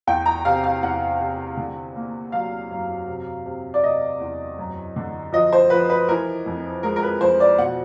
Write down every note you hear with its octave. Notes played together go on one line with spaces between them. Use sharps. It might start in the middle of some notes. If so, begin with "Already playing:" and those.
E2 G5
A#5
C3 F5
F5
E2 F#5
C3
D3
A#3
F#3 F5
F#2
C3
C3
D5
C3 D#5
E2
F#2
D3
F3 D#5
C5
F3 B4
B4
E3 A#4
F2
G#3 A#4
A#4
B4
F2 C5
D5
B2 F#5